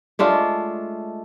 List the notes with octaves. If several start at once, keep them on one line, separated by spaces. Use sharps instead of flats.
G#3 A3 D4 F4